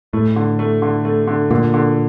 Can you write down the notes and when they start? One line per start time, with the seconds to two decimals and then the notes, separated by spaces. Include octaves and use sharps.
0.13 A2 A3
0.36 D3
0.59 A3
0.82 D3
1.05 A3
1.27 D3
1.51 A#2 D3
1.74 D3